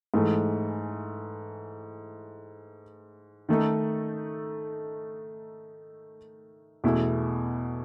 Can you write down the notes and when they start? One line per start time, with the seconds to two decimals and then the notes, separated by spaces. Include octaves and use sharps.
0.14 G#2 E3 A3
3.49 D#3 A3 D#4 A4
6.84 E2 B2 A3 E4